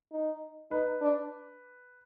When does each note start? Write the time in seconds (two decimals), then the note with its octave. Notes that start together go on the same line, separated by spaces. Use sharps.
0.12 D#4
0.71 D#4 B4
1.01 D4